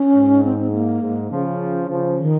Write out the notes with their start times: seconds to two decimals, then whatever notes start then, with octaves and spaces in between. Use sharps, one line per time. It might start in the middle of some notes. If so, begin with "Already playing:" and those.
Already playing: C#4
0.15 G#2
0.44 C4
0.59 C4
0.72 A#3
1.02 G#2
1.31 C#3 F3
1.88 C#3 F3
2.18 D#3